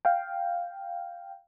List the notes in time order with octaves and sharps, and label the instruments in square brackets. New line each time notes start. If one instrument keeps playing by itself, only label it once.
[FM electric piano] F5 G5